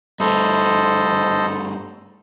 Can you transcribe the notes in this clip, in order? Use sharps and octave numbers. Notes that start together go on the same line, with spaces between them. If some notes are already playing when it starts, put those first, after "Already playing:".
G2 A3 A4 C5 D#5